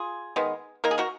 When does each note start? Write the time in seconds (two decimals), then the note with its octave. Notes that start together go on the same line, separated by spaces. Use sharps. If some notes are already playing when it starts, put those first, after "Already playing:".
Already playing: F4 G#4
0.36 D#3 G#3 B3
0.84 D#3 A#3 A#4
0.91 G#4
0.98 F#4 A#4